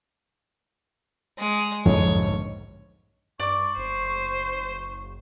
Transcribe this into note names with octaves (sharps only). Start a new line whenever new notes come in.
G#3 D#6
B1 F2 G#2 D3 C#5
G2 D5 C#6 D6
F#1 C5